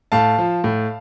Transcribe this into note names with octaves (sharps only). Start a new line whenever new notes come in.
A2 F5 A5
F3
A2